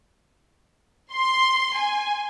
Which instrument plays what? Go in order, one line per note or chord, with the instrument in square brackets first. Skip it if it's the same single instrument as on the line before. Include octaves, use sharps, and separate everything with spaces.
[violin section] C6
G#5